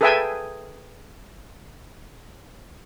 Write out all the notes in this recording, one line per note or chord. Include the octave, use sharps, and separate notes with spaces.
G#4 A4 B4 E5 G5 G#5